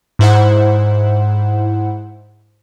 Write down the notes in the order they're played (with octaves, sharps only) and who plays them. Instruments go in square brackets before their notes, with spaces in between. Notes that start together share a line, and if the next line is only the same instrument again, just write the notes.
[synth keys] G#2 E4 C5 F#5